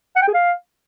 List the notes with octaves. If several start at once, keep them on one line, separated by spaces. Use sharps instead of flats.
F#5
G5
G#4
F5